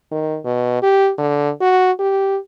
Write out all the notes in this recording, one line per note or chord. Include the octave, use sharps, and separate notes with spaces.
D#3
B2
G4
D3
F#4
G4